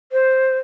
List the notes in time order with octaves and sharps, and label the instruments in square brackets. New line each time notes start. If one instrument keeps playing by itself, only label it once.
[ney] C5